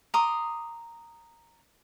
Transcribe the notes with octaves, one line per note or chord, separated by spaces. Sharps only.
A#5 C6 D6 D#6